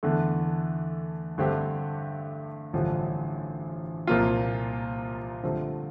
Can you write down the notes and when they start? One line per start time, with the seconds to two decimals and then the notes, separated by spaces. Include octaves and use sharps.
0.03 E2 D3 A3
1.38 G2 D3 A3 C4 G4
2.73 A1 G2 D3 F3
4.07 C2 A#2 F3 A#3 F4
5.43 G2 D3 F3 A3 C4